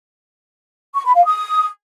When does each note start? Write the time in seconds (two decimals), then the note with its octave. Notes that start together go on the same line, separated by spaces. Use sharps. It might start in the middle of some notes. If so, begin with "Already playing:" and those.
0.95 C#6
1.05 B5
1.15 F5
1.25 D#6